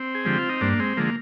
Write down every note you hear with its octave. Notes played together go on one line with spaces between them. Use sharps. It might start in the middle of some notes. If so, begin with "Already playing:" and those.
Already playing: C4
G#4
D3 F3 G#3 G4
F4
D#4
G2 A#3 D4
G#3 C4
D3 F3 G#3 A#3